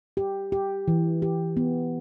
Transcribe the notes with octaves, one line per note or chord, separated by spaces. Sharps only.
G4
G4
E3
G4
B3